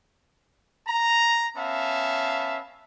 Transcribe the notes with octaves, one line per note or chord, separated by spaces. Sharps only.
A#5
B3 C#4 E5 F5 A5